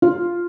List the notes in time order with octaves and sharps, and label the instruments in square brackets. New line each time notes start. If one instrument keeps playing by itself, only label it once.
[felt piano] F4